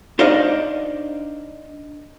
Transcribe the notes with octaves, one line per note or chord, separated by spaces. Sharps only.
D4 D#4 C5 D5 D#5 F5